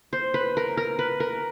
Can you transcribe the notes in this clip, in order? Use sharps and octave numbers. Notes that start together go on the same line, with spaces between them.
C5
B4
A#4
A#4
B4
A#4